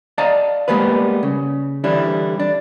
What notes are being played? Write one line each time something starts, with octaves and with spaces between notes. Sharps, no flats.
D5 D#5 F5 A5 A#5
G3 G#3 A#3 B3 B4
C#3
D3 E3 G3 D4 E4
D4